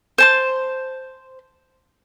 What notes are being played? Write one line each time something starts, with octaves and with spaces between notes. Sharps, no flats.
C5 A5 C6